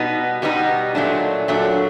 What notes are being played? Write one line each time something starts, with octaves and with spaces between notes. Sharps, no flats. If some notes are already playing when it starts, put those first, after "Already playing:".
Already playing: B2 G3 B3 D#4
B2 G3 B3 D#4
A#2 F#3 A3 D4
A#2 F#3 A3 D4